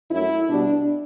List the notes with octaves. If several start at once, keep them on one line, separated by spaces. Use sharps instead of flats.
F#2 F#3 A3 E4
B2 G3 B3 D4